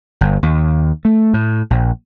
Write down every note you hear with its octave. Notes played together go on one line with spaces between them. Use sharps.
G1
D#2
A3
A2
A#1